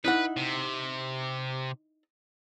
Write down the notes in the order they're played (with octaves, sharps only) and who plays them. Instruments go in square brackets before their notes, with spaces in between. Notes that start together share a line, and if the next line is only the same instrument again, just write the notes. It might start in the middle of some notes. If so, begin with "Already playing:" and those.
[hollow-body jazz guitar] D#4 E4 F#5 [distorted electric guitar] B4
[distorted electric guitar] C3